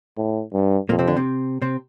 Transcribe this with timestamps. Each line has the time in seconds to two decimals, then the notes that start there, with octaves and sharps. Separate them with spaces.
0.18 A2
0.53 G2
0.89 F2 A#2 A#3
0.99 C3 C4
1.07 D3 D4
1.16 C3 C4
1.62 C3 C4